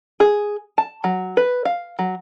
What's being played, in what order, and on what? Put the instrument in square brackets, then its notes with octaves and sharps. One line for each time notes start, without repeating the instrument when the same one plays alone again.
[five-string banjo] G#4
A5
F#3
B4
F5
F#3